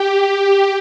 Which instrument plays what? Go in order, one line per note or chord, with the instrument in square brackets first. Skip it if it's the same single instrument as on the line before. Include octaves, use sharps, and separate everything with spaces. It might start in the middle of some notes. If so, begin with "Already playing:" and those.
Already playing: [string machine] G4